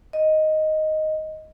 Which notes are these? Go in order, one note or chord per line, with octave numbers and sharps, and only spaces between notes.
D#5